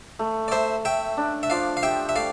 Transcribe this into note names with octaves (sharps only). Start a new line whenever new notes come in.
A3
D5
A3 C5 E5
A3 E5 G5
D4
E5
F3 D5 F5
F5
G4 E5 G5
E5
A3 D5 F5